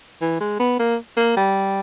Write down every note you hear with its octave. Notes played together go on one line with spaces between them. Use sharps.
E3
G#3
B3
A#3
A#3
G3